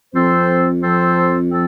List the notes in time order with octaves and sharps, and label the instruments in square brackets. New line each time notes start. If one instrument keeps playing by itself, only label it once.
[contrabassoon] F2 [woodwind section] F3 C4 A4 C5
[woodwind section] F3 C4 A4 C5
F3 C4 A4